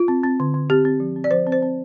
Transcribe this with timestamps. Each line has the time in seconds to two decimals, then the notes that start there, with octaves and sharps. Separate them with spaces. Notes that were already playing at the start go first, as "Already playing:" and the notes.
Already playing: F4
0.08 C4
0.24 C4
0.40 D3
0.54 D3
0.70 C4 G4
0.85 C4
1.00 F3
1.16 C4
1.24 D5
1.31 F3 C5
1.47 C4
1.52 C5
1.62 C4